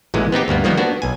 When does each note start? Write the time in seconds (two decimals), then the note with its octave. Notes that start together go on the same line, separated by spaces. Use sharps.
0.14 A1 A#2 E3 G#3
0.32 B3 C4 D#4 G4
0.48 D2 G2 A#3 B3
0.64 D#3 F3 G3 A#3 B3
0.78 B3 D4 F#4
1.02 B1 G#5